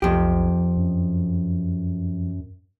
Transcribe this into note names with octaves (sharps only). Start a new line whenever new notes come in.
B1 F2 G4
F#2